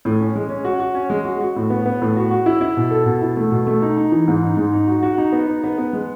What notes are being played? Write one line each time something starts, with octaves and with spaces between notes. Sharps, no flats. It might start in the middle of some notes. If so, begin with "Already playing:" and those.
A2
C#4
G#3
C#4
F#4
F#4
C#4
G#3
F#4
F#4
A2
B3
B3
A2
F#4
F#4
E4
E4
B2
A4
B2
E4
A3
B2
A3
D#4
D#4
E3
G#2
D#4
G#2
D#4
F#4
F#4
D#4
B3
D#4
B3
B3
G#3